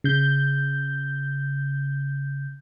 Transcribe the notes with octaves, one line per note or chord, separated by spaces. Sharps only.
C#3 G6